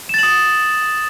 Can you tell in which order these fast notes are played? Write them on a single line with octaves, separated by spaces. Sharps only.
E7 A6 F#7 D#6